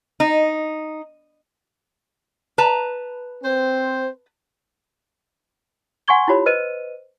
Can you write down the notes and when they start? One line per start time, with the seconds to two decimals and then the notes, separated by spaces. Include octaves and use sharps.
0.20 D#4
2.58 B4 A5 A#5
3.43 C4 C5
6.08 F#5 G#5 C6 C#6 G#6 G7
6.28 E4 F4 G4 C#5 B5
6.46 B4 C5 D#5 D#7